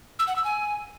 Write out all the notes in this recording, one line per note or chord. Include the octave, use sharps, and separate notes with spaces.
E6
F#5
E6
G#5